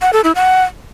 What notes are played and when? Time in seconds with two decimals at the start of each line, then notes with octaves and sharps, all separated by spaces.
0.02 F#5
0.13 A4
0.24 E4
0.35 F#5